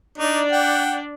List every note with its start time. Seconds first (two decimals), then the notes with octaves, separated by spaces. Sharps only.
0.18 D4 D#4 D5
0.52 F#5 G5